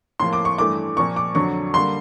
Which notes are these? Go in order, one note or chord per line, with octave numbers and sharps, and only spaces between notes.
A2 F3 A#3 C6
D6
C#6
G2 E3 A3 D6
A#2 F3 A#3 C#6
D6
F2 D3 F#3 C#6
D3 G3 A#3 C6